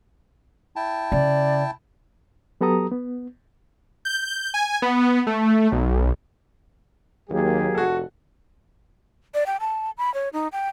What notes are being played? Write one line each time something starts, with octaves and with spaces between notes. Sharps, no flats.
E4 G5 A5
C#3 D5
F#3 B3 G4 A4 A#5 D#6
B3
G6
G#5
B3
A3
B1
D#2 F#3 A#3 G4 G#4
F1 F#4 A4
D5
G5
A5
B5
C#5
D#4
G5